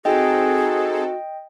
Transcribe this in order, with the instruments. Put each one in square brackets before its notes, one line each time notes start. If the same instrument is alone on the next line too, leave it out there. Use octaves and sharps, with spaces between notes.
[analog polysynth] C4 D#4 A4 [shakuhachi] F#4 [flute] G#4 [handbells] D#5 G5